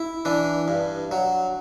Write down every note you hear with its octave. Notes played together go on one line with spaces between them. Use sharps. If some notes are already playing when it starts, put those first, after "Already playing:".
Already playing: E4
E3 D4
G2
F#3